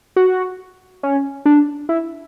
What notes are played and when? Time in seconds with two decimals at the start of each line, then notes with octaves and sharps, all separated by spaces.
0.16 F#4
1.03 C#4
1.46 D4
1.89 E4